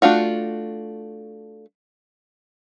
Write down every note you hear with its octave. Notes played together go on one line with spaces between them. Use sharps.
A3 D4 F4 F#4